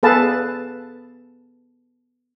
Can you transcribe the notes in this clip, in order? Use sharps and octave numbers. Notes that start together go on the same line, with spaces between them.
B3 G#4 A4 B4 F5 A5